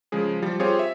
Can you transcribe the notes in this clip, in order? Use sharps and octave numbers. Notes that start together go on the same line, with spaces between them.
C#3 F3 G#3 G#4
F3 G3
C4 F4 G4 G#4 C5 C#5
E5